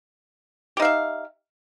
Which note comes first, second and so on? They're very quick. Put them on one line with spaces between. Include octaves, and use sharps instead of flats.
G4 D#4 F5 E5